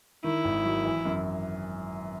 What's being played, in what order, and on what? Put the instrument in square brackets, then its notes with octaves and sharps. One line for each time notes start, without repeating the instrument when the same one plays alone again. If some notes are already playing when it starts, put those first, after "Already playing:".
[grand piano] D#3 [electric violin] E4
[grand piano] G#1
F#3
E3
F#2